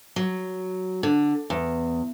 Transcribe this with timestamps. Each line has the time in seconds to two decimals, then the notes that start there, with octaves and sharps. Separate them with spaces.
0.16 F#3
1.03 D3
1.50 E2